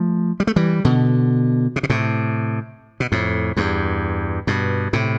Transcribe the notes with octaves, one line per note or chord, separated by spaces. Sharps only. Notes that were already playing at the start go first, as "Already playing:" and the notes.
Already playing: F3 A3
G3
A3
E3 G3
B2 D3
C3
B2
A2 C3
B2
F2 A2
E2 G2
G2 B2
A2 C3